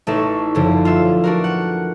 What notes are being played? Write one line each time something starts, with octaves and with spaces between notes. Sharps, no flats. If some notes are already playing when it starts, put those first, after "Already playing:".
A1 A3 D#4 E5 C#6
F#2 D3 F3
F4 E5
D4 F#4 A#4
F#5